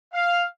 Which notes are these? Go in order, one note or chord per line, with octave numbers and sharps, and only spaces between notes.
F5